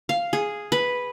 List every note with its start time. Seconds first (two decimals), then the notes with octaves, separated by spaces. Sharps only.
0.09 F5
0.33 G#4
0.72 B4